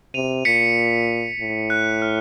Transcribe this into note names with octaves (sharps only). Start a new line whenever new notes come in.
C3 D#7 F7
A#2 B6 C#7
A2
F#6
F6